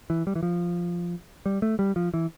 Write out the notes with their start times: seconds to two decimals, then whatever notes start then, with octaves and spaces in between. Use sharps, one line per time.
0.10 E3
0.27 G3
0.35 E3
0.43 F3
1.46 G3
1.62 A3
1.79 G3
1.96 F3
2.14 E3